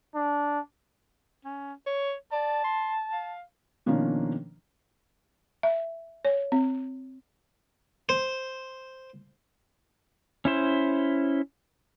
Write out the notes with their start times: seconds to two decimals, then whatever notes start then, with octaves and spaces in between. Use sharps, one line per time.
0.15 D4
1.45 C#4
1.86 C#5
2.32 D5 A5
2.64 C6
3.13 F5
3.86 B2 D#3 F3 A#3 C#4 D4
5.63 E5
6.25 C#5
6.52 C4
8.09 C5
10.45 C#4 E4 C5